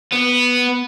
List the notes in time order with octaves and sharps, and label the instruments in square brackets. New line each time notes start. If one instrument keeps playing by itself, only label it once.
[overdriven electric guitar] B3